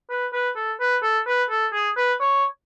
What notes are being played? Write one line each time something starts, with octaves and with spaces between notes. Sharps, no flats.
B4
B4
A4
B4
A4
B4
A4
G#4
B4
C#5